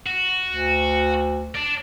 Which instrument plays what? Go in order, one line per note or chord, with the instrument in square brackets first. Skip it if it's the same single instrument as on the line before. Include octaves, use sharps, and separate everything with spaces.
[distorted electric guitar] F#4
[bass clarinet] D2
[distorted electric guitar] D5 A5